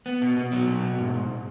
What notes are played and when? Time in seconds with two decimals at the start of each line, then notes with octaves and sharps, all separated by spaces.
0.06 B3
0.22 B2
0.36 B2
0.52 F#3
0.67 B2
0.83 B2
0.99 G#2
1.14 G#2